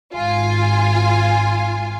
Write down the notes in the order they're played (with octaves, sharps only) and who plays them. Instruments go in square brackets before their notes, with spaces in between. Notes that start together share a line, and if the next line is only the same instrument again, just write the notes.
[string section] G#1 F4 G#5